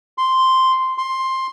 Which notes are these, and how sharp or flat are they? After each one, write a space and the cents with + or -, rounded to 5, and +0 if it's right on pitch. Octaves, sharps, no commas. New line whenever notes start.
C6 -5
C6 +10